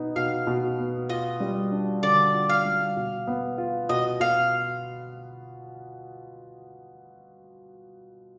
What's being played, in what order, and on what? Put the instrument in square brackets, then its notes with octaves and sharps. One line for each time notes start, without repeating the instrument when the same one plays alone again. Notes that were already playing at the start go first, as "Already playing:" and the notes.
Already playing: [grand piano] B2 B3 D#4
[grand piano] B2 [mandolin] F5
[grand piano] B2
B3
[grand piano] F4 [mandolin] D#5
[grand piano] G3
D4
[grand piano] D3 [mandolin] D5
[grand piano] F4
[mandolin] F5
[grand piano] G3
B2
B3
F4
[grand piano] B2 [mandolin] D#5
[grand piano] B2 [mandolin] F5